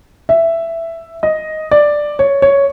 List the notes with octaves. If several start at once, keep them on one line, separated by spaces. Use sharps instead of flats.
E5
D#5
D5
C#5
C#5